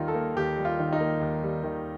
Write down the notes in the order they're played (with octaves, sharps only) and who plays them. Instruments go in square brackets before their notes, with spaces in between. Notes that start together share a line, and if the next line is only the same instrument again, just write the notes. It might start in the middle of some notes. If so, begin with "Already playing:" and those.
Already playing: [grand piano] D#2 D#3 G3 D#4 F4
A4
A#3
D#2 G4
G3
F4
D#3
D#4
A#3
D#2
G3
D#3